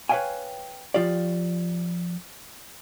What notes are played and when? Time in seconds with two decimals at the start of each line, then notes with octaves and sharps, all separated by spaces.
0.09 B4 C#5 E5 F5 G5 G#5
0.94 F3 F4 G4 D5